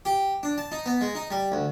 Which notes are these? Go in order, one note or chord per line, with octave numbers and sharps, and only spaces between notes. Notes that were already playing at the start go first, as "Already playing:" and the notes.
G4
D4
A5
D#4
B3
G#3
D#4
G3
D2